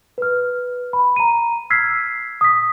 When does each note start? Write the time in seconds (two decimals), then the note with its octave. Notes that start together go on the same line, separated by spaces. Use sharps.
0.18 B4 F6
0.93 B5
1.16 A#5 D#7
1.70 E6 F6 G#6 B6 C7
2.41 D#6 B6